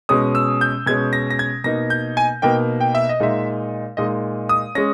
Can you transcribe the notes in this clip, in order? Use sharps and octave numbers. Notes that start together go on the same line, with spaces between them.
B2 G#3 C#4 D#6
E6
G6
B2 G#3 C#4 G#6
A#6
A#6
G#6
B2 A#3 D#4 A#6
G6
G#5
B2 A#3 D#4 G5
G5
E5
D#5
A#2 G#3 D#4 E5
A#2 G#3 D#4 D#5
D#6
G#3 C#4 A#6